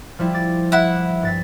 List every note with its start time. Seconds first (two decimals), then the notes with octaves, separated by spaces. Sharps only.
0.19 F3 G3 E4
0.33 D6 A6
0.72 E4 F#5
1.23 G2 A6 B6